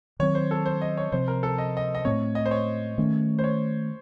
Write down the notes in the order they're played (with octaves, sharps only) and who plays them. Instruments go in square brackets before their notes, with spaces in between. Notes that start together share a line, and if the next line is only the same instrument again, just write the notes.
[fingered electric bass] D#3 F#3 C4 [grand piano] C#5
[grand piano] C5
A4
C5
D#5
C#5
[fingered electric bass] C3 F3 C4 [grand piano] C5
[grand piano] A#4
A4
D#5
D#5
D#5
[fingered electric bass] A2 A3 C4 [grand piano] C#5
[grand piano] D#5
C5
C#5
[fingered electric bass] D#3 A3 C#4
[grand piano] C5
C#5